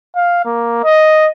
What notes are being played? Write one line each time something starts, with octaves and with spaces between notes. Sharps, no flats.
F5
A#3
D#5